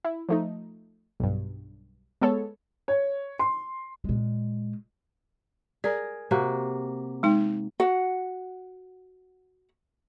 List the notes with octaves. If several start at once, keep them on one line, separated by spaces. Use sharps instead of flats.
E4
F3 A3 D#4
B1 G2
G#3 B3 A4 C#5
C#5
C6
A#2 G#3
G#4 A#4 D5
C3 A#3 F#4
G#3 D#4 G5
F#4 F#5